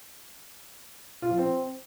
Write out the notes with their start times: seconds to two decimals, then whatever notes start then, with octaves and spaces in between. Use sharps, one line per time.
1.22 F4
1.30 F3
1.38 C4